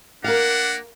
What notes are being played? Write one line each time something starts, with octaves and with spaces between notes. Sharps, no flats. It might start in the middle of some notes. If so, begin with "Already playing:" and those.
A#3 D4 A#4 F5 F#5